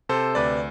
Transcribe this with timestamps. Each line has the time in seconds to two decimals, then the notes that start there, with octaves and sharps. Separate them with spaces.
0.09 C3 A4 C5
0.35 D2 B4 D5